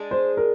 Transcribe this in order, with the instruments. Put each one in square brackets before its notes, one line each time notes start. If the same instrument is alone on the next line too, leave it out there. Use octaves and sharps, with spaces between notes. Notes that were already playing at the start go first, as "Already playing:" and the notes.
Already playing: [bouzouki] G#3 D4 G#4
[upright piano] C5
A#4